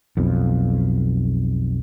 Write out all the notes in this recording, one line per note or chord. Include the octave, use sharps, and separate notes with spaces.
B1 F2